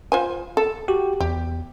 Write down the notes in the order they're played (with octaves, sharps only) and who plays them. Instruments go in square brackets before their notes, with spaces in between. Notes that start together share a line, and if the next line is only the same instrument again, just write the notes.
[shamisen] F4 C5 G#5
A4
[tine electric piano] F#4 G4
[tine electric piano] E2 [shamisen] G4